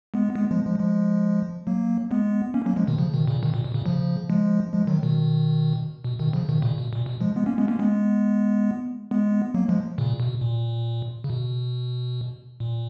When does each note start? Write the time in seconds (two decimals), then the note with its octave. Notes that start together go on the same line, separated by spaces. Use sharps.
0.14 G#3 B3
0.35 G#3 B3
0.51 F3 G#3
0.66 F3 G#3
0.80 F3 G#3
1.67 F#3 A#3
2.11 G#3 B3
2.54 A#3 C#4
2.65 F#3 A#3
2.76 F3 G#3
2.87 B2 D#3
2.98 C#3 F3
3.14 B2 D#3
3.27 A#2 C#3
3.43 B2 D#3
3.54 A#2
3.64 B2
3.74 A#2 C#3
3.86 C#3 F3
4.30 F3 G#3
4.73 F3 G#3
4.87 D#3 F#3
5.02 B2 D#3
6.04 B2
6.19 B2 D#3
6.33 C#3 F3
6.49 B2 D#3
6.62 A#2 C#3
6.78 B2
6.93 A#2
7.06 B2
7.21 F3 G#3
7.36 G#3 B3
7.46 A#3 C#4
7.58 G#3 B3
7.68 A#3 C#4
7.79 G#3 B3
9.11 G#3 B3
9.54 F#3 A#3
9.68 F3 G#3
9.98 A#2 C#3
10.20 B2
10.41 A#2
11.24 C#3
11.30 B2
12.60 A#2